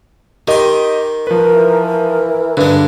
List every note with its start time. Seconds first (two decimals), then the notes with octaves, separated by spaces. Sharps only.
0.48 D#3 G4 D#5 C6
1.27 F3 A#4 B4
1.54 E3
2.57 G2 D3 G#3 B4